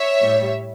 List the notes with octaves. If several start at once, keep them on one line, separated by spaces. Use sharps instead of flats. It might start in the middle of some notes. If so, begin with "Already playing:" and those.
Already playing: C#5 E5
A2 G3